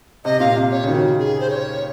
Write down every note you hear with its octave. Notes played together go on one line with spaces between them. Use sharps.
C3 D#5
A#2 F5
C3
C#5
C#3
D#3 F#4
G#4
C5
C#5